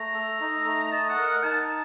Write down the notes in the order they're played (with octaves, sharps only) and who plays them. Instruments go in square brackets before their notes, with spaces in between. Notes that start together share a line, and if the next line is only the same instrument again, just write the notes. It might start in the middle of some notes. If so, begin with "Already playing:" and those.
Already playing: [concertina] A3 [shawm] A#5
[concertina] A4
D#4
A3
[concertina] D#5 [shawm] A5
[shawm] F#5
[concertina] A#4
[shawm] F#5
[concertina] D#4 [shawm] A5